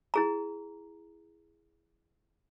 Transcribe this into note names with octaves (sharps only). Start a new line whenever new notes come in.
E4 G#4 A#5